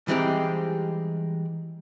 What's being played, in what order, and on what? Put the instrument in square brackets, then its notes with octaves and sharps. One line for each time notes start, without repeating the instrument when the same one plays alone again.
[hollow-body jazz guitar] E3 G3 G#3 C4 D#4 G4